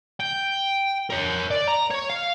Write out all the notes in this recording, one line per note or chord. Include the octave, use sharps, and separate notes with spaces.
G5
A#4 C#5
D5
A#5
C#5
F5